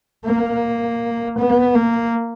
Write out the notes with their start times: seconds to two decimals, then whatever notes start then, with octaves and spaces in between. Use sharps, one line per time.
0.25 A#3
1.38 B3
1.75 A#3